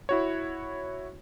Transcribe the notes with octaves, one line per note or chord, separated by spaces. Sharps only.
E4 F#4 C#5